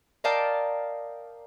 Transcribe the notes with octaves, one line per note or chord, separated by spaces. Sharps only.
A#4 D5 D#5 F5 G5 A5